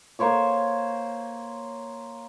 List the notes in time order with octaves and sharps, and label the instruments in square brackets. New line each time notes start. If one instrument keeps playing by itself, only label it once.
[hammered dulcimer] A#3 C5 C#5 D6